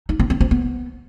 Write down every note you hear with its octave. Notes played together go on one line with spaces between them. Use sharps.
D#4
C4
C4
C4
B3